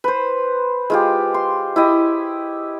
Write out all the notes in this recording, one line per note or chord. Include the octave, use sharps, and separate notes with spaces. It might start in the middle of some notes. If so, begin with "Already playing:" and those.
B4 C5
G#3 F4 G4
C6
E4 G4 D#5